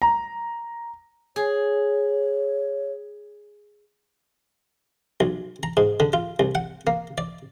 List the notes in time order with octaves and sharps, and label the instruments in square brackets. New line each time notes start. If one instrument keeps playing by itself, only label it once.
[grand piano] A#5
[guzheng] G#4 [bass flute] C#5
[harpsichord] B1
A#5
G#2
D3
F4
C2
F#5
A#3
D5